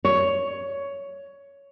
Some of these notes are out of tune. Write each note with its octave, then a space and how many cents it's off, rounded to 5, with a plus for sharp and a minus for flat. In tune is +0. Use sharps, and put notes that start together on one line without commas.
C#5 +10